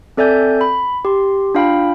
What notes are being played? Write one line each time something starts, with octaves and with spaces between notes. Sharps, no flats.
C4 A4 D5 E5 G#5 G6
B5
G4 C6
D4 F4 F5 G5 B5